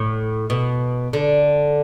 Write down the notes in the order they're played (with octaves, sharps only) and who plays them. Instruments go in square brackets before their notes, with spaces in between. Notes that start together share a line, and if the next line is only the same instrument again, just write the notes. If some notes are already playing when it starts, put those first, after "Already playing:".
Already playing: [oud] A2
B2
D3